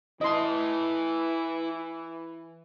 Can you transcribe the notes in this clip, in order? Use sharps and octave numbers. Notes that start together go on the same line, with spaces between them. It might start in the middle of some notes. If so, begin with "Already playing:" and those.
E3 E4 D#5 A5 C6